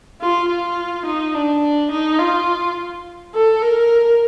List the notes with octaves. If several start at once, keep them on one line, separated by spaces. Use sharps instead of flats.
F4
F4
D#4
D4
D#4
F4
A4
A#4